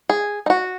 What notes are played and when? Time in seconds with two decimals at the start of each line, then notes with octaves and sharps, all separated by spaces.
0.09 G#4
0.46 D#4
0.50 F#4